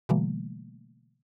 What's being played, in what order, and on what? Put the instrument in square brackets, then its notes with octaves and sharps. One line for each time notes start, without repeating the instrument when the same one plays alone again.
[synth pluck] B2 D3 E3 G3 A3 A#3